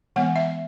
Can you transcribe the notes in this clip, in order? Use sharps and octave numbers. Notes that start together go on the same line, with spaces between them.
E3 G#3 B3 F#5
E5